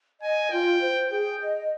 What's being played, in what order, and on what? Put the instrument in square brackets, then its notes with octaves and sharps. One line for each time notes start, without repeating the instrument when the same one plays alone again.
[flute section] D#5 [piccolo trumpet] G#5
[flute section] F4 [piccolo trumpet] G5
[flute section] C5
[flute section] G#4 [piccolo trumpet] G5
[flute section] D#5